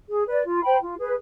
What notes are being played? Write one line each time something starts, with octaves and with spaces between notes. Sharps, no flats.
G#4
B4 D5
F4
C5 G5 B5
F4
G#4 B4